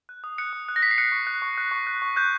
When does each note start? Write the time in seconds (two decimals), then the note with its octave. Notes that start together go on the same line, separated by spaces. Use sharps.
0.09 F#6
0.24 D#6
0.38 F#6 C#7
0.53 D#6
0.69 F#6
0.76 A#6
0.83 D#6 B6
0.91 C7
0.98 F#6 C#7
1.12 C#6
1.27 F#6
1.42 C#6
1.58 F#6
1.71 C#6
1.87 F#6
2.02 C#6
2.16 F#6 G6